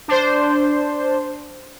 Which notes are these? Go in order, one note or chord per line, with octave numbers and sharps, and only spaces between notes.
D4 C5